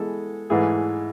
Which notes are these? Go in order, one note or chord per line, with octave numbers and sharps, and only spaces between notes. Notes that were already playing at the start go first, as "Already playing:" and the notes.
Already playing: E3 G#3 B3 A4
G#2 E3 A3 E4 G#4